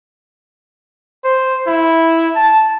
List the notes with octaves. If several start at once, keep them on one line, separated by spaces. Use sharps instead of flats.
C5
E4
A5